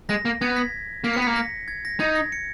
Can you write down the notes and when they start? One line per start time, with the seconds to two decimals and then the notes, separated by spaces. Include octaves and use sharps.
0.09 G#3 A#6
0.25 A#3
0.41 B3 G#6
0.56 B6
1.04 A#3 B6
1.13 B3 C#7
1.22 B6
1.27 A#3
1.36 A#6
1.68 G#6
1.85 A#6
2.00 D#4 G#6
2.15 A#6
2.32 C#7